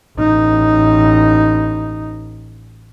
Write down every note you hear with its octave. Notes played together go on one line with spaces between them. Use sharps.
A1 D#4